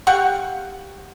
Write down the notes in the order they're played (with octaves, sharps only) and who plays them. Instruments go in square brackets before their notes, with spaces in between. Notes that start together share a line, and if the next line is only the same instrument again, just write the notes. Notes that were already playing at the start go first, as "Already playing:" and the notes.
[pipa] G4 F5 F#5 C#6